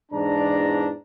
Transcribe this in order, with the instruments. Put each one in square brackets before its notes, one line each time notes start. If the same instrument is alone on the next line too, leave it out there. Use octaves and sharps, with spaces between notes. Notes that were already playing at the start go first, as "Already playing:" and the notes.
[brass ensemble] E2 G#2 D4 A#5